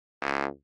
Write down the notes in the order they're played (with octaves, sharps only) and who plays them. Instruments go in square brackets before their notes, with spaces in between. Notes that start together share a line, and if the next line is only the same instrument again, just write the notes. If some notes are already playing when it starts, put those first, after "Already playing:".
[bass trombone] C#2